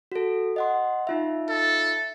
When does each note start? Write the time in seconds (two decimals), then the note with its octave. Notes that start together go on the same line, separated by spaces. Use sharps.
0.12 F#4 A4
0.56 D#5 F#5 C6
1.07 D#4 F4 E5
1.50 A4